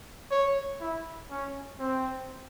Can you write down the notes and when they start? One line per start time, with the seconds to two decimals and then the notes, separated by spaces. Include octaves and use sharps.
0.31 C#5
0.80 E4
1.30 C#4
1.79 C4